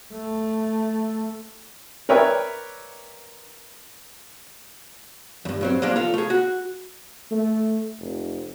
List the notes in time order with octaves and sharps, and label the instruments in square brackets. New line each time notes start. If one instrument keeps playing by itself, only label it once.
[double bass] A3
[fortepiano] A#4 B4 C#5 D5 E5 G5
[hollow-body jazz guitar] E2 G2
G2 F#3 C4
F3 G3 G#3 A#3 D4
F4 A4
A3 G#4
F#4
[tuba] A3
F1